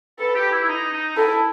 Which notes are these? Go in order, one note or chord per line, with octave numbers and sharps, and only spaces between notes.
A4 B4
G4
E4
E4
D#4
D#4
E4 A4